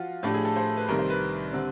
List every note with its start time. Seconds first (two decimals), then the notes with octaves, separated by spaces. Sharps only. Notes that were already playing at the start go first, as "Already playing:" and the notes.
Already playing: F3 F4 F#4
0.23 A2 F3 A3 D4 G4
0.34 G#4
0.45 A4
0.56 C5
0.77 B4
0.88 C2 C3 D#3 A#4
0.99 C5
1.10 B4
1.53 D3 G3 C4